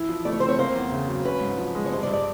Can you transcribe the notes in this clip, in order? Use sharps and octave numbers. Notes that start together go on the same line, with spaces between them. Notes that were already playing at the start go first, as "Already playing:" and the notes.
Already playing: E3 E4
F3
A3 D5
C#5
C4 C5
C#5
A#3 C5
E2
C#3
F#3
C#4 B4
G#2
F3
G#3
C#5
G2 C5
D5
G2
D5